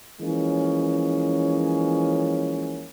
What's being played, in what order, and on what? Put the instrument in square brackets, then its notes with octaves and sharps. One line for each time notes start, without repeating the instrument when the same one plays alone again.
[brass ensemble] E3 F3 G#3 A#3 C#4